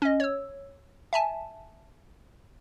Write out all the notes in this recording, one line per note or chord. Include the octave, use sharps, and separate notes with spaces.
C#4 D#5
C#5 E6
E5 G#5 A5